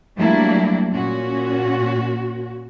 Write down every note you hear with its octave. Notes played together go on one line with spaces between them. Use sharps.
F#3 G3 A3 A#3 D4 E4
A#2 C#4 F#4